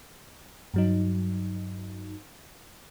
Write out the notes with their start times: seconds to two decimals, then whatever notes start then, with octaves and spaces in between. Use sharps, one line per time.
0.74 G2 F#3 D#4